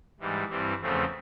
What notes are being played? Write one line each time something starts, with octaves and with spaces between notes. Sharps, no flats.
G#2 E3 G3
G2 E3 G3 C4
E2 C#3 F3 A3 C4